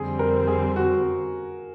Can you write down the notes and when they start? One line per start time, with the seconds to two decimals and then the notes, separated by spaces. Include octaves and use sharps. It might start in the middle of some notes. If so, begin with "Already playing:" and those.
Already playing: F2 D3 G3 C4 G#4
0.19 A#4
0.47 G#4
0.76 F#4